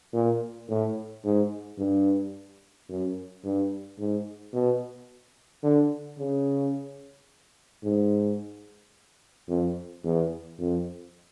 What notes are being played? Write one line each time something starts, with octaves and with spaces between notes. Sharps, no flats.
A#2
A2
G#2
G2
F#2
G2
G#2
B2
D3
C#3
G#2
F2
E2
F2